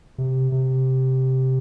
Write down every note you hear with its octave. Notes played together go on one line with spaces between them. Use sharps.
C3
C3